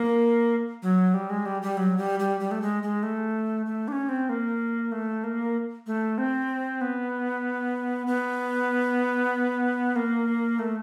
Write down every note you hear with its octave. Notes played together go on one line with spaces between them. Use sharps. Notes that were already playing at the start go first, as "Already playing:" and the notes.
Already playing: A#3
F#3
G3
G#3
G3
G3
F#3
G3
G3
G3
A3
G#3
G#3
A3
A3
D4
C#4
C4
A#3
A3
A#3
A3
C4
B3
B3
A#3
A3